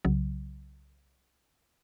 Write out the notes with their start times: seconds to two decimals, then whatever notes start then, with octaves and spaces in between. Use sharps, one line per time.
0.05 C2 C#3 F#3